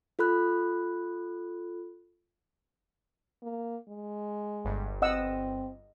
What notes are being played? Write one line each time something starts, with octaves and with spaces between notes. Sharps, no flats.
F4 A4 B5 F#6
A#3
G#3
G1 G2
C4 D#5 F#5 E6